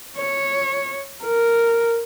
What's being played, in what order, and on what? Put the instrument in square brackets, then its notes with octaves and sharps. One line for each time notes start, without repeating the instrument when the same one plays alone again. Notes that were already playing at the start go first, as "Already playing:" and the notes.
[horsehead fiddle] C#5
A#4